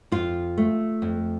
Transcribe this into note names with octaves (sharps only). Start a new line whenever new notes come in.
F2 F4
A3
F2